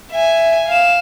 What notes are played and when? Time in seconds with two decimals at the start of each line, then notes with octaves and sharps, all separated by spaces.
0.11 E5 G#5
0.69 F5 E7